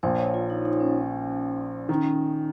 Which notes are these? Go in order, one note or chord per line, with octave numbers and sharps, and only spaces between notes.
A#1 A#2 F3 C5
C#5
F4
D#4
D#4
C#4
D#3 C#4